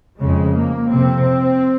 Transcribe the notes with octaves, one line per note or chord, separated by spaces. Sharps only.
F2 C#3 G#3
A#3
F2 C3 C4